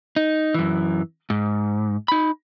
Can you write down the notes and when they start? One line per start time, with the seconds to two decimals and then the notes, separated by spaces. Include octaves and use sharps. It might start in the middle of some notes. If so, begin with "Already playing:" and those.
0.16 D#4
0.54 F#2 E3
1.30 G#2
2.08 D#4 B5